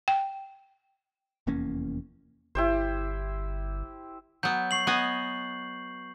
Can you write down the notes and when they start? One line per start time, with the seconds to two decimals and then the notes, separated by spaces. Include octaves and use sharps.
0.08 G5
1.47 F1 E2 A#3 C#4
2.55 G1 E4 G4 C5
4.43 F#3 B3 G6
4.71 C#6 C7 F#7
4.87 B3 D#5 G#5